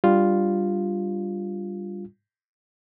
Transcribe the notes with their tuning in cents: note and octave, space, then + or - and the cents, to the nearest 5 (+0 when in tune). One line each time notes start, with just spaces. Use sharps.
G3 +0 D4 +0 F4 +0